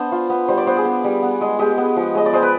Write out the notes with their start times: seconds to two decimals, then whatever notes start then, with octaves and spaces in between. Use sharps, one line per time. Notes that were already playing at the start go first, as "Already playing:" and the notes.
Already playing: B3 D4 C5
0.12 F4
0.30 B3
0.48 G3 C5
0.58 D5
0.67 B3 C5
0.76 G#4
0.85 B3
1.04 G3
1.23 B3
1.41 G#3
1.59 G#3 G4
1.78 B3
1.96 F3
2.15 G#3 D#5
2.26 D5
2.33 G#3 C5
2.42 B4